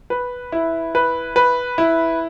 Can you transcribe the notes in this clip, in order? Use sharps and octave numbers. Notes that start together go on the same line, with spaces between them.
B4
E4
B4
B4
E4